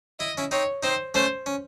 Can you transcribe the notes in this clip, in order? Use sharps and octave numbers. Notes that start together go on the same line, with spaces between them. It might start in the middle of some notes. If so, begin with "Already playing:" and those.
E4 D#5
C#4 E4
C4 D#4 C#5
C4 D#4 C5
A3 C#4 C5
C#4